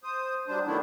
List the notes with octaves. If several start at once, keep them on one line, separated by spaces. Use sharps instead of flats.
C5 D#6
F#3 G3 D4 C5
D#3 F#3 A3 B3 D4 E4